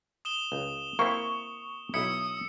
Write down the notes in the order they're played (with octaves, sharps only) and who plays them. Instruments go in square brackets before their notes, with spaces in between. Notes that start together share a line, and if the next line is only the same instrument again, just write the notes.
[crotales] D#6 E7 G7
[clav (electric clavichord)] C#2
[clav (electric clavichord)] A#3 C4 E4 [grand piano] C#6
[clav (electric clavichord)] B1 E4 [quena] D#6 [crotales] E6 C#7